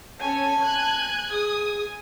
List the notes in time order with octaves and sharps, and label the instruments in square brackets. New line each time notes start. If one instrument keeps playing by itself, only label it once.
[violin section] C#4 A4 C#5 [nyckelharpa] G#5 [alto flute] A5
[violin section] F#6 G#6
[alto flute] G#4 [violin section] D#6